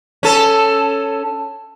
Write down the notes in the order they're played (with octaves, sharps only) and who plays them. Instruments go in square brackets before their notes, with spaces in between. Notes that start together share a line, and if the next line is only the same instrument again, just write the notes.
[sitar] C#4 A4